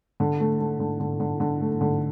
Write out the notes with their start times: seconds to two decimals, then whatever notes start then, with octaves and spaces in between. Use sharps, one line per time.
0.20 D3
0.40 A3
0.60 A3
0.79 D3
1.00 D3
1.20 D3
1.40 D3
1.61 A3
1.81 D3